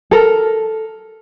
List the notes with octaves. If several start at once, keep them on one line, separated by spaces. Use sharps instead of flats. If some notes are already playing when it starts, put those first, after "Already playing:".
A4 A#4